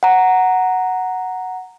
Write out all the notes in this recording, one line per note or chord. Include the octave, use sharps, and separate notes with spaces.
F#5 A#5